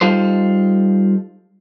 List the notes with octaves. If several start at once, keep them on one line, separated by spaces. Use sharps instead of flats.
G3 D#4 F4 A4 C5